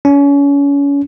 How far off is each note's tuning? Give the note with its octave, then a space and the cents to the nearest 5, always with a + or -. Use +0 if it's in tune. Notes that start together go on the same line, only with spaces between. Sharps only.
C#4 +30